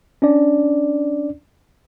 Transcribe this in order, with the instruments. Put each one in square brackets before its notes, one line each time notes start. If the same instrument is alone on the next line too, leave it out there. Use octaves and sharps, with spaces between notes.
[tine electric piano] C#4 D4 D5